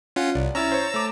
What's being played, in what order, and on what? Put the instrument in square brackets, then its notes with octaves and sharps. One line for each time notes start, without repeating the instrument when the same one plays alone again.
[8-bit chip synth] C#4 F4 F#5
[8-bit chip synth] C2 [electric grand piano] D5
[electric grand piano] C#4 E4 [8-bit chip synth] A#5 E6 A6
[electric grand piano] C5 C#5
A3 D6